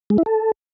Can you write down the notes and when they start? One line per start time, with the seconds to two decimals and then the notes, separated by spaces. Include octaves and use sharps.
0.10 G#3
0.18 E4
0.26 A4